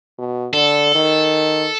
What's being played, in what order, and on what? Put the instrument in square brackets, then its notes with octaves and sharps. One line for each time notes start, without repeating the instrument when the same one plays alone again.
[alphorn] B2
[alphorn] D3 [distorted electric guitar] A4
[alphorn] D#3